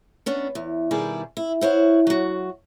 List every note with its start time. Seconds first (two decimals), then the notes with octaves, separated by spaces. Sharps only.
0.26 B3 C#4 D4
0.55 E2
0.91 B2 D#3 G3 E4 G#4 D5
1.37 E4
1.61 E4 C5 C#5 F#5
2.07 F#3 F#4